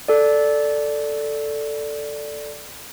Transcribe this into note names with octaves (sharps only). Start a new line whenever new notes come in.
A4 D5